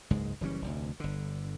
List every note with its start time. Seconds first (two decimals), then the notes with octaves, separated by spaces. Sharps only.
0.10 F#1 C#2 G#2 G#3
0.41 F#1 E3 G3 C#4
0.62 F1 D2
1.00 G1 D3